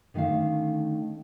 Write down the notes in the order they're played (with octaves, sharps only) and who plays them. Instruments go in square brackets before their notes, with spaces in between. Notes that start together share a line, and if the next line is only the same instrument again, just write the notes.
[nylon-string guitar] D3 D#3 A3 C#4 F5